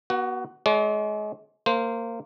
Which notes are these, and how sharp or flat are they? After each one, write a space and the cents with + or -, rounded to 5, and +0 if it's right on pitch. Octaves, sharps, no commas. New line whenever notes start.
B3 -35 F#4 +20
G#3 +30 D5 -40
A#3 -20 C5 +0